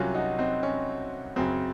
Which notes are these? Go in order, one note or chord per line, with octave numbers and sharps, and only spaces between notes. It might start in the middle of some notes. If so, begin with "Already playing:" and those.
Already playing: C2 C3 F#3 C#4 F4
D#4 F#4
C4 D#4
C#4
F#2 C#3 F#3 C4